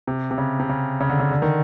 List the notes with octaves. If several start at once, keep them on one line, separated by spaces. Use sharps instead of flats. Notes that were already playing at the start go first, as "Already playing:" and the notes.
C3
C3
C#3
C3
C#3
C#3
D3
C#3
D3
D#3